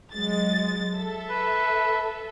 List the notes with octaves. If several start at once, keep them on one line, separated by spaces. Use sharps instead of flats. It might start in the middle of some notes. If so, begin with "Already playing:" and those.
F#3 G#3 A6
A4 E5
B4